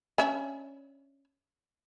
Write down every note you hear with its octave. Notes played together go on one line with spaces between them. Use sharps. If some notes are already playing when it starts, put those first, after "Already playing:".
C#4 D4 E5